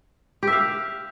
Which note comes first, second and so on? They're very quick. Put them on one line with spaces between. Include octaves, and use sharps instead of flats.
G4 E5 F5